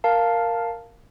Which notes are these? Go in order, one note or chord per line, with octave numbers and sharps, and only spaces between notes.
A#4 F5 A5